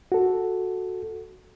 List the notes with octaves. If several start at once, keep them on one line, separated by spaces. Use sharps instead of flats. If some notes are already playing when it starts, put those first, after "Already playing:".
F#4 A4